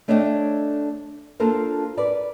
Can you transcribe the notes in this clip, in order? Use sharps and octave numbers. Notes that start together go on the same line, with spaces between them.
A3 D4 C#5 D#5 F5 G5
A#3 D4 F4 A4 A#4 C5
A#4 B4 D5